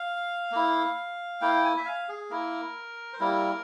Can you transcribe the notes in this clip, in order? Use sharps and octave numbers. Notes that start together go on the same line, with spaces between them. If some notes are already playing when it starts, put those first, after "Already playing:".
Already playing: F5
A#3 E4
A#3 E4 G5
G#5
E5
F5
G#4
A#3 E4 A#4
C5
G3 A#3 E4 A#4